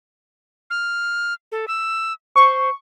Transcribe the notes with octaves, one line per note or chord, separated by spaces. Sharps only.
F6
A4
E6
C5 C#6